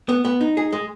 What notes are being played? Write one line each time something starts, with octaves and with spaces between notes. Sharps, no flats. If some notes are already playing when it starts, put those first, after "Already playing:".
B3
B3
D#4
G#4
G#3